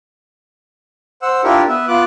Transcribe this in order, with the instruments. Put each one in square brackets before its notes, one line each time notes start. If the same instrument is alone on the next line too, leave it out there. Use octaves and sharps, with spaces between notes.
[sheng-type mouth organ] C5 F#5 E6
D4 E4 F4 G4 A#4
B3 B4 E5
B3 F4 D6 F#6